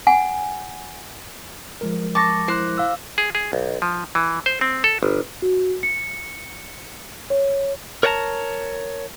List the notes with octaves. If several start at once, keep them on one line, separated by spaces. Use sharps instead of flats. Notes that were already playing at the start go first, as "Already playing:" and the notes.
F#5 G#5
F3 G#3 A#4
A5 C#6 D6 A#6
E4 C5 F#6
F5 E6
G#4
G#4
B1
F3
E3
C5
C4
A4
G1
F#4
C#7
C#5
A#4 C#5 D5 F#5 A5 A#5